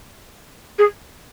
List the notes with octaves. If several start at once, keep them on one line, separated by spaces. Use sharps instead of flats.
G#4